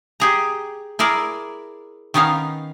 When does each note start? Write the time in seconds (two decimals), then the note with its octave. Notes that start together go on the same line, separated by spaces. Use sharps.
0.20 G4 G#4 A#5
0.99 E4 G#4 A#4 D5
2.14 D#3 B3 C#4 D#4 F5